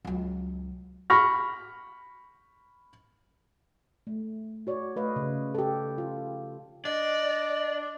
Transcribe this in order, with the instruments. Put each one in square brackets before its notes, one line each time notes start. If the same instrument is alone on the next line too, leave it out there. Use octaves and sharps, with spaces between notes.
[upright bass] C#2 F#3
[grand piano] B5 C#6 F6 A#6
[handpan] A3
F#4 C#5 D5
A3 B4 C#5 D#5 F5
C#3
G4 A4
F4
[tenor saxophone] D4 [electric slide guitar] D5 [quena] D#5